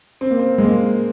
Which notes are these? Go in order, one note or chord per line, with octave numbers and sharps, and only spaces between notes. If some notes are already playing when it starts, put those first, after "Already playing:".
C4
A#3
C4
G#3
A#3